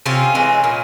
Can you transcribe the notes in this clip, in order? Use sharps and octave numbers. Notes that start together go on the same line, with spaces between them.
C3 C#4 F4
E3 G#3
A#2